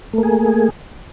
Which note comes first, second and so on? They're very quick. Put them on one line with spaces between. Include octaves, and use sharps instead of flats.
A3 A#3 G#4